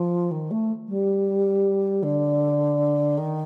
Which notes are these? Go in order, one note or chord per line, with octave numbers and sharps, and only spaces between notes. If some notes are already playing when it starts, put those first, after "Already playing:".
Already playing: F3
D#3
A3
G3
D3
D#3